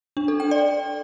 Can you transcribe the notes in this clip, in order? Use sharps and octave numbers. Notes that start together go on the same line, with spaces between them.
D4
A4
G5
D5